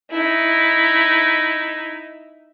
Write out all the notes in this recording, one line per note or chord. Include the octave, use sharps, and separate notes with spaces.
D#4 E4